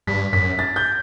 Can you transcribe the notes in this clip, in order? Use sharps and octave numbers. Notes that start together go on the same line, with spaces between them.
G2 B6
F#2 B6
A6
G6